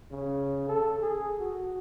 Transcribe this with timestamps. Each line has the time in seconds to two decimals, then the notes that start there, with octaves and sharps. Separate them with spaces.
0.12 C#3
0.69 A4
1.02 G#4
1.39 F#4